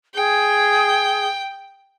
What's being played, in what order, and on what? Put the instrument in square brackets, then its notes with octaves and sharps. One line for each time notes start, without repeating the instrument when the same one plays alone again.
[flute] G#4 [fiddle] G5